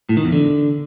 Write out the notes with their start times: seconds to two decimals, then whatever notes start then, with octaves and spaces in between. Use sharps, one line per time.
0.09 A2
0.17 D#3
0.25 E2
0.32 D3